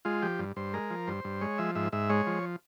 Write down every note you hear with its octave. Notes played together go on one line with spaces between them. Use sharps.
G#3 F4
F3 G4
G2
G2 C5
G#3 A#4
F3
G2 C5
G2
G#3 C#5
F3 E5
G#2 E5
G#2 E5
G#3 C#5
F3